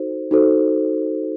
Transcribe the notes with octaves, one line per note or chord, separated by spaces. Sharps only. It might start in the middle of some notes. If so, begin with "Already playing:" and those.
Already playing: D#4 F#4 A4 C5
D#4 F#4 A4 C5